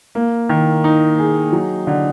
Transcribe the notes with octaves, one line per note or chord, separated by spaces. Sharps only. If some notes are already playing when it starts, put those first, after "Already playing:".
A#3
D#3
D#4
G#4
F#3
D3